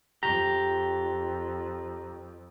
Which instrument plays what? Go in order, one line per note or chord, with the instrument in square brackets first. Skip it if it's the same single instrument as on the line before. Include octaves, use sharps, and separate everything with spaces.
[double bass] F2 [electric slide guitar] G4 [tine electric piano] A#5